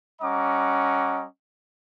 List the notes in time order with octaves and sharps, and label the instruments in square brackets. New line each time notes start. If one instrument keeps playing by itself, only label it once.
[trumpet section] G3 C#4 D#5 F#5 A#5 D6